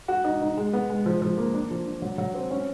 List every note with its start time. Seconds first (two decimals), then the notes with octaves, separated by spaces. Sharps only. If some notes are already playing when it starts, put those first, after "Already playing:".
0.08 F#4
0.24 D#4
0.41 D#4
0.57 G#3
0.73 B3
0.90 G#3
1.06 F3
1.22 F3
1.37 A#3
1.54 D4
1.71 F3
1.86 D4
2.02 F#3
2.18 F#3
2.35 C4
2.51 C#4